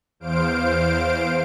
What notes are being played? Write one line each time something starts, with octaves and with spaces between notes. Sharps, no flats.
E2 C5 F5 D7